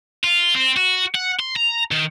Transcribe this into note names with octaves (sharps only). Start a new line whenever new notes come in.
F4
C4
F#4
F#5
C6
A#5
D#3